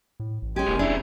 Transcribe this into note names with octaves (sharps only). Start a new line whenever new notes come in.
A2
A1
G#3 C#4 G4 G#5
E1 C#3 E3 A#3
C4 D4 E4 G#4